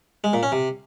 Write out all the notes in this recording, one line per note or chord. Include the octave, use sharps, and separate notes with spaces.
G#3
A#2
C#4
C3